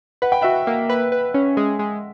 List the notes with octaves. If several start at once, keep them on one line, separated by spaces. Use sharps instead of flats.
B4 F#5
G5
F#4 E5 F#5
A#3
B4
B4
C#4
G#3
G#3